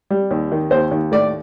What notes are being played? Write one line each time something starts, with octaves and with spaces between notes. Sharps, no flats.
G3
D#2
D#3
D#2 C5
D#2
A2 D5